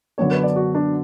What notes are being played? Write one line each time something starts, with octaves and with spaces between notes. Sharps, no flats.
F#2 D3 F#3 B3 D4 C#5
B4
D5
F#4
D4